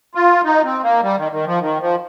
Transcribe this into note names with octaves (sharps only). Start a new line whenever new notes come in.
F4
D#4
C4
A#3
G3
D#3
D#3
F3
D#3
F3